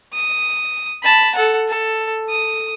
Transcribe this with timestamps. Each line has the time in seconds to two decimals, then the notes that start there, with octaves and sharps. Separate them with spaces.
0.13 D#6
1.03 A5 B5
1.35 A4 F#5
1.68 A4
2.29 D#6